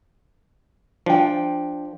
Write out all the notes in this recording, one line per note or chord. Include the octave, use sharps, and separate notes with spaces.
F3 D4 G5